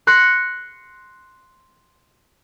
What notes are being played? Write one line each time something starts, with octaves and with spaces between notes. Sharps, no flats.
C6 F#6 A#6 C#7